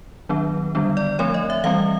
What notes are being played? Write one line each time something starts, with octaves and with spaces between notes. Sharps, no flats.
D#3 F#3 B3 D4
D3 G3 B3 D4
D5
F3 A3 C4 C#5
D#5
E5
E3 G3 C4 F5